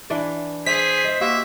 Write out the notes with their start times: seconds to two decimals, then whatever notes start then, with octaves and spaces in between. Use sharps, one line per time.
0.10 E3 D4 D5
0.66 G#4 C5 E5 B6
1.04 D#5 E5
1.21 A#3 F#4 G4 C5 E5